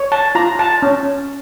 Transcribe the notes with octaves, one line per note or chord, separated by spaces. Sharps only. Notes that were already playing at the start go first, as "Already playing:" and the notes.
Already playing: C#5
A5
F4 A#5
A5
C#4